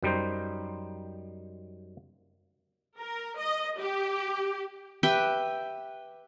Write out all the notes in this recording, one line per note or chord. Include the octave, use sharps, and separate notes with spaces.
F#2 G3 D#4 C5
A#4
D#5
G4
G4 B4 E5 G5